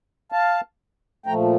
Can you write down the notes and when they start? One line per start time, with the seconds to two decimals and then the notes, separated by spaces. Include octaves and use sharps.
0.32 F5 A5
1.26 A#2 F3 A3 G5 A#5